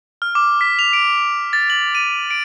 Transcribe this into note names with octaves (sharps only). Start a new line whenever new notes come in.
F6
D6
B6
F7
D7
A6
F#7
D#7
D7